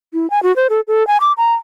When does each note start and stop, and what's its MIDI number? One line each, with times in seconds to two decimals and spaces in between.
0.14 0.30 64
0.30 0.42 80
0.43 0.54 66
0.56 0.67 72
0.70 0.81 69
0.88 1.06 69
1.07 1.17 80
1.21 1.33 86
1.38 1.54 82